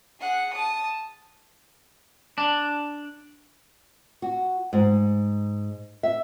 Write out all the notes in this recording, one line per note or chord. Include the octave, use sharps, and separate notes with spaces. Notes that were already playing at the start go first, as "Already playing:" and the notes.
G#4 F#5
A5 D#6
D4
F#4
G#2
E5